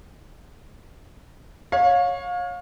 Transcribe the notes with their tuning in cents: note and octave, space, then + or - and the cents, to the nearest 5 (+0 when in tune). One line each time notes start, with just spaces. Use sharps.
C#5 -5 F5 +30